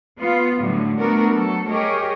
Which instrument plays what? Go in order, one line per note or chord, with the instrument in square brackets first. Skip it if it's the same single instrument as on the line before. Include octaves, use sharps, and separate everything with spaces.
[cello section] B3 F4
A2 D3 F#3 G3
A3 B3 D4 F#4 A#4
F#3 A3 A4
G3 G4 G#4 A#4 C#5 D#5